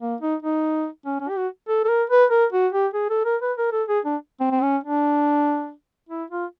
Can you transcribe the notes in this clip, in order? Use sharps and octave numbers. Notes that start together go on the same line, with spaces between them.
A#3
D#4
D#4
C#4
C#4
G4
F#4
A4
A4
A#4
B4
A#4
F#4
G4
G#4
A4
A#4
B4
A#4
A4
G#4
D4
C4
C4
C#4
D4
E4
F4